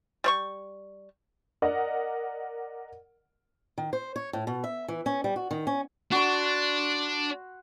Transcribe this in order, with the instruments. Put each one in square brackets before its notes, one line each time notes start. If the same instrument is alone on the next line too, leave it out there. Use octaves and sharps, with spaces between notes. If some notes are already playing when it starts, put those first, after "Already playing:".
[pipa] G3 C#5 C#6
[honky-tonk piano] A#4 D5 D#5 F#5
[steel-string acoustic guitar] D#3
C5
C#5
A2
B2
E5
E3
C#4
G3
F#4
D#3
C#4
[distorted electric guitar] D4 [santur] F#4 C6